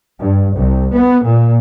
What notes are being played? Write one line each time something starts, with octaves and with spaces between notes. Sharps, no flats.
G2
C2
B3
A#2